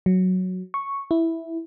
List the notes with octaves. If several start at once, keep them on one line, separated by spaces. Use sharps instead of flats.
F#3
C#6
E4